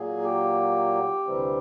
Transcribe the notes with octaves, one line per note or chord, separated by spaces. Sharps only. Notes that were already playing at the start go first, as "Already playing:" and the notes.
Already playing: A#2 F#3 A#3 G#4
G4
D2 C3 E3 G3 C4